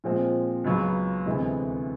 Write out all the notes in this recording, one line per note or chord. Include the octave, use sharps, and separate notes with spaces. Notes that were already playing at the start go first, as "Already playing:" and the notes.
A#2 F3 G#3 C4
C#2 C#3 F#3 B3
D2 C3 E3 G#3 B3